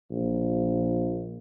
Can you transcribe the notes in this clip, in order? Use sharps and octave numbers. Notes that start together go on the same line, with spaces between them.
A#1